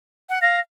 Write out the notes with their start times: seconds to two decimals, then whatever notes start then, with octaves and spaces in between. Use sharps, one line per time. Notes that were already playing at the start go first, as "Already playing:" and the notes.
0.29 F#5
0.42 F5 A#6